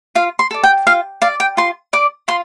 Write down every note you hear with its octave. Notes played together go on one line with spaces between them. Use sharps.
F4 F5
C6
A4 D5
G5
F4 F5
D5 F5
G5
F4 C6
D5 D6
F4 C6